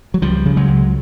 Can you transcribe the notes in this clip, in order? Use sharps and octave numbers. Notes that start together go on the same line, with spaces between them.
F#3
C#2 F3 G3
C#3
F#3 G#3
C#2